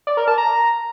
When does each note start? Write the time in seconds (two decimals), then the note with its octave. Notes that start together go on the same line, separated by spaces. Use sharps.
0.07 D5
0.17 A#4
0.27 A5
0.38 A#5